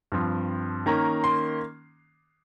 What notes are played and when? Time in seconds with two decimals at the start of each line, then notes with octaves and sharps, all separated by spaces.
0.12 G2 F3 C4
0.86 D#3 A#3 C#4 A#5
1.24 C6